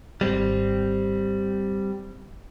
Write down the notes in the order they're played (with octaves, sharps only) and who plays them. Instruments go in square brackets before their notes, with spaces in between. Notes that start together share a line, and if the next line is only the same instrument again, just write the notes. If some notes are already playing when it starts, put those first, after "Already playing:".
[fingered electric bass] G#1 G#3 [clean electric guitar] G3 C4